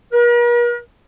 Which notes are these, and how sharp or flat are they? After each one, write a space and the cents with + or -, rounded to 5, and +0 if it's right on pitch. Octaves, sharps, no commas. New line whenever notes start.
A#4 +45